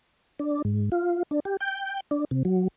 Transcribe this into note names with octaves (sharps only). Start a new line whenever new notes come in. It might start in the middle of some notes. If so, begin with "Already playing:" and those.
D4
G#2
F4
D4
G4
G5
D4
C3
F#3